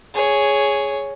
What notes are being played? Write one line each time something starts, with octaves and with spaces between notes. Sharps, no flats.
G#4 C#5